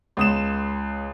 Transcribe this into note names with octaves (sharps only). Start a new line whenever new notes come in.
C#2 D#6 E7